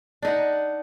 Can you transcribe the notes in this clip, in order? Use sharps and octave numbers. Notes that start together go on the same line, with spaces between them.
D4 D#4 F#5